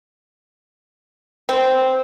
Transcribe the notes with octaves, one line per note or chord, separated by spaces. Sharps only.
C4